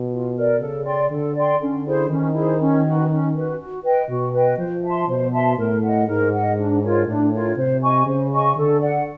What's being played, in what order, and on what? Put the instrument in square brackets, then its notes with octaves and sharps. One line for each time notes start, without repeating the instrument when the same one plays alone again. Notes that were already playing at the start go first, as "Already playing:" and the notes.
Already playing: [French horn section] B2
[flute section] F4
A#4 D5
[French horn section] C#3 [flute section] A4
[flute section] D5 G5 C6
[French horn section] D3 [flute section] A4
[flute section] D5 G5 C6
[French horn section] D3 [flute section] C#4
[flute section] E4 G#4 C5
[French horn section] D#3 [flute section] C#4
[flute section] E4 G#4 C5
C#4
F#4 B4
C#4
F#4 B4
F#4
B4 D#5 G5
[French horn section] B2 [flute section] F#4
[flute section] B4 D#5 G5
[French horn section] F3 [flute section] C5
[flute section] E5 A5 C6
[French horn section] B2 [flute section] C5
[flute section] E5 A5 C6
[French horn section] A2 [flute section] A#4
[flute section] D#5 F#5
[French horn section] G#2 [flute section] A#4
[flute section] D#5 F#5
D4
F4 A#4 C#5
[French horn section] A2 [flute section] D4
[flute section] F4 A#4 C#5
[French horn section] C3 [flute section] C5
[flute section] D#5 G#5 C#6
[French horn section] C#3 [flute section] C5
[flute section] D#5 G#5 C#6
[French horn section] D3 [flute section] A4
[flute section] D5 F#5